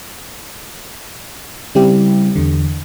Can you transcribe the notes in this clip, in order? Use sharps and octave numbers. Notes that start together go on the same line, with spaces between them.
C#3 G3 C4 E4 G4
E2 D3